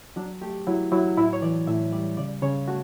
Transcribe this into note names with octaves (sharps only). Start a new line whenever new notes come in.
F#3 D4
A3 G4
F#3 E4
F#3 E4
A2 E4
C#5
E3 D5
A2 E5
G3 D5
C#3 D5
C#3 C#5
A3 F#4